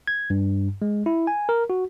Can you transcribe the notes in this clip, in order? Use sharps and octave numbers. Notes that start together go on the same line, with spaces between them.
G#6
G2
G#3
E4
G#5
A#4
F#4